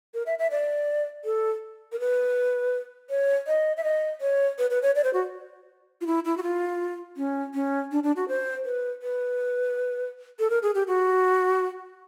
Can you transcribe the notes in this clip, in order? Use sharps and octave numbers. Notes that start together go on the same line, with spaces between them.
A#4
E5
E5
D5
A4
A#4
B4
C#5
D#5
E5
D#5
C#5
B4
B4
C#5
D5
C5
F#4
F4
E4
E4
F#4
F4
C#4
C#4
D4
D4
F#4
C5
B4
B4
A4
A#4
G#4
G4
F#4